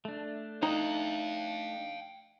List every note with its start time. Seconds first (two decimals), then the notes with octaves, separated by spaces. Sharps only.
0.05 A3 D4
0.63 D#4 F5 G5 A#5